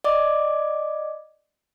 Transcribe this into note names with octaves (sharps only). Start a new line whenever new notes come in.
D5 D#5 D6